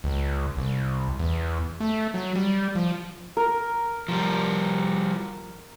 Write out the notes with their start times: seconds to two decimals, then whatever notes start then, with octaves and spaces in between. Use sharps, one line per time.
0.04 C#2
0.57 C2
1.19 E2
1.80 A3
2.14 F#3
2.36 G3
2.76 F3
3.37 A#4
4.08 F3 G3